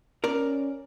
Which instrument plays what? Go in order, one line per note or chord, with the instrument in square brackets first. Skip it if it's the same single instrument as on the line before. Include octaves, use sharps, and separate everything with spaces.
[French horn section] C#4 [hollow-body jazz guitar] A#4 D5